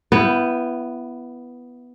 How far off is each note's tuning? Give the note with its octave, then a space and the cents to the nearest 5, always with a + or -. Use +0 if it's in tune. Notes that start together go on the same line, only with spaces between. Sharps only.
B3 +0 E4 +25 G5 +0